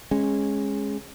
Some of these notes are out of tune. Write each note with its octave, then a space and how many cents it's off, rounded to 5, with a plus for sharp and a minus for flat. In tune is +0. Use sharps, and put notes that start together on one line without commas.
G#3 +0 C#4 -15